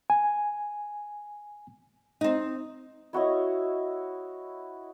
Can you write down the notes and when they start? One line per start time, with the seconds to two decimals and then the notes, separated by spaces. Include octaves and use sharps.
0.10 G#5
2.21 C4 D#4
3.13 E4 F#4 C#5 D#5